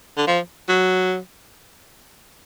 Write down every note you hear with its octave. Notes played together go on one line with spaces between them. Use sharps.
D3
F3
F#3